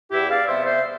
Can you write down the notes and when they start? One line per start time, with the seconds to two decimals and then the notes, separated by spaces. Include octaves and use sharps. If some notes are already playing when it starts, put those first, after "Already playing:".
0.11 E2 E4 G4
0.29 D5 F5
0.47 C3 G3 B3 C5 E5
0.65 C5 E5